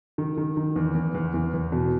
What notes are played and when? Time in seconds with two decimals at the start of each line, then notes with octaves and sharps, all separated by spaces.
0.18 D#3
0.37 D#3
0.57 D#3
0.76 E2
0.95 E2
1.15 E2
1.34 E2
1.54 E2
1.72 B2